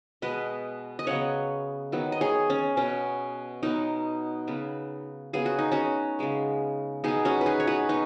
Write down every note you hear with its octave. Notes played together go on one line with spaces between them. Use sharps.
B2 G#3 B3 B4 D#5
D#5
C#3 F#3 B3 C#5 F#5
D#3 F#3 B3
D#5
G#4 C#5
C#4
B2 B3 C#4
B2 F#3 B3 D#4
C#3 F#3 B3
C#3 F#3 B3 G#4
F#4
D#4
C#4 F#4
C#3 G#3 B3
B2 B3 D#4 G#4
C#4 F#4
B4
D#4 G#4
C#5
F#4 B4
B2 D#4